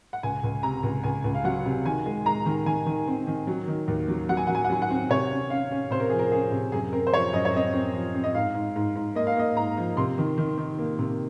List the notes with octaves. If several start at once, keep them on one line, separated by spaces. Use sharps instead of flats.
F#5
C#2 G#5
C#2
C3 A#5
C#2
C#2 G#5
C#2
F5
F#3 F#5
C3
D#3 G#5
G#3
G#3 A#5
D#3
D#3 G#5
D#3
C4
D#3
F#3
D#3
D#2
F#3
F#3 F#5
G#5
F#3 F#5
G#5
F#5
F#3 G#5
F#5
C4
C3 C#5
C#4
C#4 F5
C#4
C3 C5
A#4
F3 G#4
A#4
C#4 G#4
C3
F#2 G#4
C4 A#4
C5
F3 C#5
F#2 D#5
C#5
C4 D#5
C4
F3
C4
D#5
G#2 F5
G#2
G#2
G#2
A#3 D#5
F5
A#3 D#5
G#2 A#5
F3
C3 C6
D#3
D#3
D#3
A#3
C3